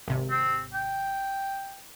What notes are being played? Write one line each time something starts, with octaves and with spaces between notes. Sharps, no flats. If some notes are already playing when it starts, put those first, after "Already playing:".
G#1 C3
C4
G5